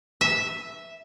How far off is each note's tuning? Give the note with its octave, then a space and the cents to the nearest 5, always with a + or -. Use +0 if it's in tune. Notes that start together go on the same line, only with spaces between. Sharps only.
E5 -5